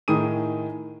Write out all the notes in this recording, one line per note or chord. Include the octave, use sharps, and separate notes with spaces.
A2 D#3 G#4 D#6 D#7